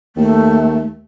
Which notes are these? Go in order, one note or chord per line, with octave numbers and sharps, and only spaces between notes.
D#2 A3